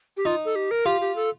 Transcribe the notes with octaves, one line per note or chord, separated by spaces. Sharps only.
G4
D#4 F4
A4
G4
A#4
F4 G4
G4
A4